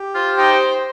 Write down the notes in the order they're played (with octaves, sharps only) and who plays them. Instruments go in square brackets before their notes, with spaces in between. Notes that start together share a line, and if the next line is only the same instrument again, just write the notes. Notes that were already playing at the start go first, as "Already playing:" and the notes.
Already playing: [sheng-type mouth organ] G4
[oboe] F4 [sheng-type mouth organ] C5
[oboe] D#4 [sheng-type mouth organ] G5